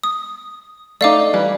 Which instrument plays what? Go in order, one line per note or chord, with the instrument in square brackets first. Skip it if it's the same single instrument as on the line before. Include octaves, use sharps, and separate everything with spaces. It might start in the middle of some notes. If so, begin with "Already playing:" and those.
[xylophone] D#6
[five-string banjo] A3 D#4 [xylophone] D5 F5 D6
[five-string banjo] E3 G3